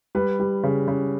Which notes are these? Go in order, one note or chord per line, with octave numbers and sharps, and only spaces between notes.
G3 B4
G3
C#3
C#3